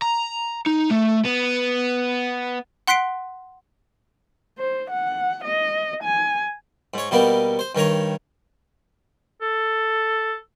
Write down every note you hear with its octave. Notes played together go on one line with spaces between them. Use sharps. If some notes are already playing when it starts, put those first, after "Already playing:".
A#5
D#4
A3
B3
F#5 C6 F#6 B6 C7 D7
C5
F#5
D#5
G#5
G#2 C#5
B2 G3 A#3 B3 G4
C5
G2 D#3 C#5 A#5
A4